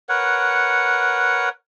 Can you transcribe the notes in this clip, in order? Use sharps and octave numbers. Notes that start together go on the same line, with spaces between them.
A#4 B4 C#5 F#5